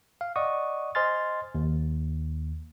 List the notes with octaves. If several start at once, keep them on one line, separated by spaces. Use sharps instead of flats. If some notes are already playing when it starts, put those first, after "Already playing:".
F5
D5 D#5 F#5 C#6 D#6
C5 D#5 G#5 C6 F6 A6
D#2